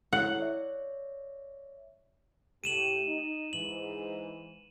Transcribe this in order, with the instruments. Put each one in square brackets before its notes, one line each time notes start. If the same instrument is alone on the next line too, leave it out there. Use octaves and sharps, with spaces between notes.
[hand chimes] E4 A4 C#5 [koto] F#5
[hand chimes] C#5 D5 E5
[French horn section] A2 A3 G4 [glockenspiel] D#7 E7 F#7
[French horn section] D#4
[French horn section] G#2 E3 [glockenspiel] F#7